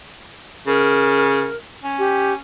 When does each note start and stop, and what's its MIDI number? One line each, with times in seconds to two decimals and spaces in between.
0.67 1.48 49
0.67 1.56 70
1.83 2.37 61
1.99 2.33 67